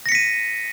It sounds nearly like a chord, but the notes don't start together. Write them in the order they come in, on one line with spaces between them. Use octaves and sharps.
A#6 C#7 B6 D#7